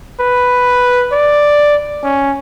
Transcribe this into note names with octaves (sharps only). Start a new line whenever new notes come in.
B4
D5
C#4